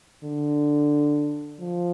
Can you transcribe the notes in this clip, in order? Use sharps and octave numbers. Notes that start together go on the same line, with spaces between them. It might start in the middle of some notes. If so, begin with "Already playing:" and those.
D3
F3